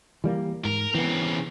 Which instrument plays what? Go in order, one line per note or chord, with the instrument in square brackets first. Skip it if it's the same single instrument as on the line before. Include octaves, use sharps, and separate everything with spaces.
[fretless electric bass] E3 G3 A#3
[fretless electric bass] G#2 [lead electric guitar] A#4
[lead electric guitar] C#3 C4 [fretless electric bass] E3 B3